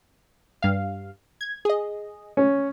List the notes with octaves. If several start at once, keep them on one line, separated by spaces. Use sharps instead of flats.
G2 F5
G#6
G#4 D#5
C#4